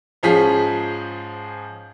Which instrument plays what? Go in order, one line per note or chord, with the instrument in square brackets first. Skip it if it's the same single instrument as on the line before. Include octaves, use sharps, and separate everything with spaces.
[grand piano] G#2 F3 C#4 G#4 B6